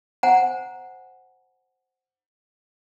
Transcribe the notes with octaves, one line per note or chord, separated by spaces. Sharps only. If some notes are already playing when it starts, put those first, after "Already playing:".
C5 F#5 G#5 A#5